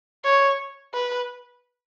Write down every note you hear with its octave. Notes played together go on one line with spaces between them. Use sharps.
C#5
B4